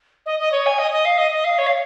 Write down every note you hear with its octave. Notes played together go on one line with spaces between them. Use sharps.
D#5
D#5
C#5
G#5
D#5
D#5
F5
D#5
D#5
F5
C#5
F5